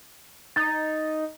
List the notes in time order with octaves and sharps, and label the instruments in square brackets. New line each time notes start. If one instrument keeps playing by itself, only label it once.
[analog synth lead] D#4 [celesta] A6